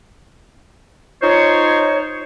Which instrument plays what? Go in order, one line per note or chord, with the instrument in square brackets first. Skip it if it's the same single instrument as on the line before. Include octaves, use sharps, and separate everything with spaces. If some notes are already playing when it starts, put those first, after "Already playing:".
[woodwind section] D#4 F4 C5 C#5